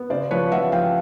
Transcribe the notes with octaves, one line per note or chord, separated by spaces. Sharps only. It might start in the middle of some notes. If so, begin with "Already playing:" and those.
Already playing: B3
C#3 C5 D5
F3 B4 C#5
F3 E5 F#5
F3 F5 G5